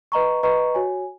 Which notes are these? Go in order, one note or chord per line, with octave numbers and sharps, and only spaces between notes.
B4 D#5 A#5 C#6
B4 D#5 A#5 C#6
F#4 C#5 G#5